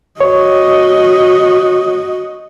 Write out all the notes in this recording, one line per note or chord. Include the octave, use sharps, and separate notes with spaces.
F#4 C#5 D#5